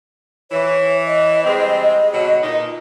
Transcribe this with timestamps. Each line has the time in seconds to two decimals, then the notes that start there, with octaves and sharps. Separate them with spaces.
0.51 E3 C#5
1.07 D#5
1.44 G3 G#3 C4
2.14 B2 D3 F#3
2.43 A#2 D#4